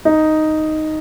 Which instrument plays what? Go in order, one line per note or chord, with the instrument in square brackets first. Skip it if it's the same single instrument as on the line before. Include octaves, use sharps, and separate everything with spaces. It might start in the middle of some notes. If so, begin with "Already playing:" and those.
[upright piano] D#4